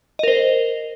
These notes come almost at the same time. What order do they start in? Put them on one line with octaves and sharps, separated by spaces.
D#5 A#4 C5